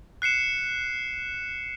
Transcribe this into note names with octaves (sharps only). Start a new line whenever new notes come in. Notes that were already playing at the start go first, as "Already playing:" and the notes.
F#6 C7 C#7 E7